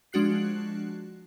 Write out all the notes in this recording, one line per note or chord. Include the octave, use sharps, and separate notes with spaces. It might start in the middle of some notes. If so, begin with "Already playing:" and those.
F3 G#3 D4 F#4 F#6 C7